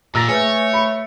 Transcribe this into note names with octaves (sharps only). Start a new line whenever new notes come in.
A#2 A#5 E6 A6 A#6
A3 G#4 B4 C#5 G#5 C#6
B5 C#7